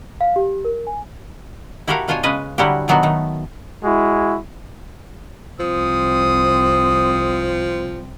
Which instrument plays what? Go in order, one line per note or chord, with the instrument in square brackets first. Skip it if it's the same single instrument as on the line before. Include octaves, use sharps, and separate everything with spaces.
[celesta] F5
G4
A#4
G#5
[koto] E4 F#4 G4 A4 A#4 F5
B2 D4 F4 C5 C#5 G#5
C#3 G#3 C#4 B4 D#5 G#5
D3 F#3 G3 E4 F#4 G4
B2 D#3 F#3 B3 D4 F#4
D#3 A3
[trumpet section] G#3 E4 F#4
[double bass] C2 C4 [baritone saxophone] F3 [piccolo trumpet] D#6